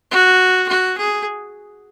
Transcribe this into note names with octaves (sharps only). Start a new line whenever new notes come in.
F#4
F#4
G#4